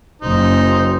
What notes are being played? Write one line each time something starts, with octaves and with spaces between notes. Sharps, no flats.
F#1 D#4 C5